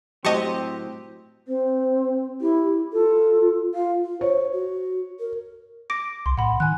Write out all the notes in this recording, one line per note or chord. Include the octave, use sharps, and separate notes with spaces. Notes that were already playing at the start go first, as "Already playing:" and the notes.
A2 F#3 C4 G4 D#5 A5 C#6
C4 C5
E4 G4
F4 A4
F4 F5
F4
C5 C#5
F#4
A#4
D6 A#6 D7
C2 C6
A2 F#5 B5
D#3 G#5 F#6